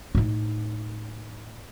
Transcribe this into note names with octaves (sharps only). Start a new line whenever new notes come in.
A2 D#4